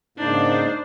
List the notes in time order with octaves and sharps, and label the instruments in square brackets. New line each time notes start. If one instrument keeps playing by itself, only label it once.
[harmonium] G#2 C#3 A#3 [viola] D4 C5 [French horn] D#4